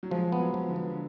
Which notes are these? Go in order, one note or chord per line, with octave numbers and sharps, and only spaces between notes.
F#3
F3 G#3
B3
F#3
F3
D3
B3
D3